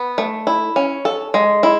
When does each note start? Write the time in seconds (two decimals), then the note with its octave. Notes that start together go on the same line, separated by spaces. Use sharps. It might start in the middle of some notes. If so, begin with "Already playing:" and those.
Already playing: B3
0.18 A3
0.47 E4
0.76 C#4
1.05 A4
1.34 G#3
1.63 E4